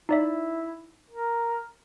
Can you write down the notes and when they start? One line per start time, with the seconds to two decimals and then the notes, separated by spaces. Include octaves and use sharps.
0.09 D#4 E4 D5 E5
1.10 A#4